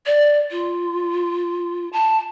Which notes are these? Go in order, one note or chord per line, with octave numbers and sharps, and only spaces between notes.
D5
F4
A5